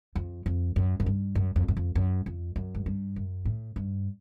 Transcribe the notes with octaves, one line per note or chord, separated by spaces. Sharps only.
F2
F2
F#2
F#2
G2
F#2
F2
F#2
F2
F#2
F2
F#2
G#2
G2
F#2
A2
G2